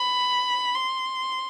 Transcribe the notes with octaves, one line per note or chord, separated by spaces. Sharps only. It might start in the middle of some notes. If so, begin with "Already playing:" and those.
Already playing: B5
C6